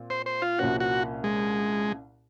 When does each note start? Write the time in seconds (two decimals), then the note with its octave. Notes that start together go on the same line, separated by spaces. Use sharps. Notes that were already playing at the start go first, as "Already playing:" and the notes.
Already playing: A#2 C4
0.10 C5
0.26 C5
0.42 F4
0.59 C2 A#2 F3 A#3 C#4 F#4
0.80 F#4
1.24 G#3